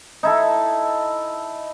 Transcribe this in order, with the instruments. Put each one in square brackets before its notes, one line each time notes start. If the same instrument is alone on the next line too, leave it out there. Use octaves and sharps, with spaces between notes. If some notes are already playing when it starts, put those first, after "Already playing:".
[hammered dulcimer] D#4 E4 A4